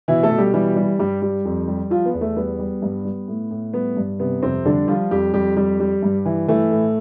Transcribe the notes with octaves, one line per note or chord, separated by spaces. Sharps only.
B2 E3 E4
A3 A4
B2
G3 G4
E3 G3 G4
G3
G2 G3 G4
G3
F2
G3
F3 F4
B3
E2
A3
G3 B3
G3
G2
G3
A2
A2
G3 B3
G2
C3 B3
F2 C3 C4
D3 G3 D4
F3 G3 F4
F2 G3 G4
F2 G3 G4
G3 G4
G3
G2
E3
E3 A3
A2